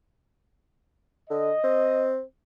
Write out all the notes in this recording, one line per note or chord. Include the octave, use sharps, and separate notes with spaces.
D3 D#5
C4